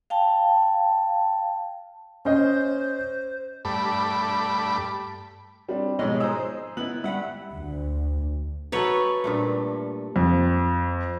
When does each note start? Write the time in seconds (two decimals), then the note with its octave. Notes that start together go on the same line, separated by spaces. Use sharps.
0.10 F5 G5 A5
2.25 C#4 C5 D#5
3.65 G2 A3 B5 D6
5.68 G3 C4 D4
5.99 G#2 B2 F3 G#3 C#5 D#5
6.20 G#4 C5 A#5 E6
6.77 B3 E4 F#7
7.04 G2 E5 F#5 B5
7.53 D2
8.72 D#4 F#4 A4 B4 C#5
9.24 G2 A#2 A3
10.16 F2